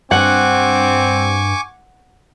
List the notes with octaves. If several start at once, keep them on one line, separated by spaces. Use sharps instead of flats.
G2 C4 F#5 G#5 C#6 D6